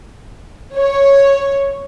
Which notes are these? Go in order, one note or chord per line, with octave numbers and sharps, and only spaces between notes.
C#5